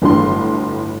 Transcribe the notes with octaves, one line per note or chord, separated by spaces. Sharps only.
G1 A2 F#3 D4 C6